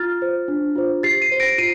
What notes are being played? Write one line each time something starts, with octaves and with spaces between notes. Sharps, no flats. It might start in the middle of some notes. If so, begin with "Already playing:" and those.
Already playing: F4 F6 A6
C5
D4
F4 C5
G4 A6 C7
C7 D#7
C5
A#6 D7
F4 C7 D#7